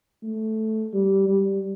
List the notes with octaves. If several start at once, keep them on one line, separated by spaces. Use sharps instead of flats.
A3
G3
G3